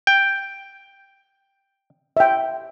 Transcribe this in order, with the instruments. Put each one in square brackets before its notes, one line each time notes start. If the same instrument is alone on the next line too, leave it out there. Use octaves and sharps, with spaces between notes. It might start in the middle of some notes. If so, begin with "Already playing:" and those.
[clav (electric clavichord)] G5
[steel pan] E5 G5